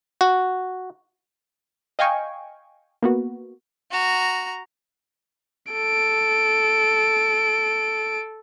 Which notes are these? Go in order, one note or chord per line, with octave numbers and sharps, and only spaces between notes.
F#4
D#5 F5 G5 G#5 C#6
A#3 B3 F#4
F#4 A#5
A4 D7